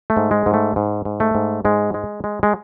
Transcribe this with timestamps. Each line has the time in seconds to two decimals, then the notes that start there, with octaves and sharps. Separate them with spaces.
0.10 A3
0.17 G#2
0.31 G#3
0.46 G#2
0.54 A3
0.76 G#2
1.05 G#2
1.20 A3
1.35 G#2
1.65 G#2 G#3
1.94 G#3
2.24 G#3
2.43 G#3